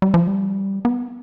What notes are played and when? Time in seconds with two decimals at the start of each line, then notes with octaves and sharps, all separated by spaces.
0.02 G3
0.14 F3
0.27 G3
0.85 B3